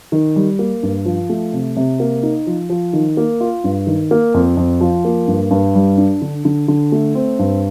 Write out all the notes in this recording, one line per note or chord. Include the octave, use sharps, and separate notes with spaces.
D#3
G3
A#3
G2
F3
A3
C3
C3
A#3
D#4
F3
F3
D#3
A#3
F4
G2
D#3
A#3
F2
F2
F3
A#3
G2
G2
G3
D4
D3
D3
D3
A3
C4
G2